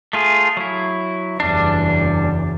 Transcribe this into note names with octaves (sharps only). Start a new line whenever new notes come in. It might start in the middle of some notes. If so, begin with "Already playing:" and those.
A3 F4 G#4
F#3 E4
F#1 E2 G3 D4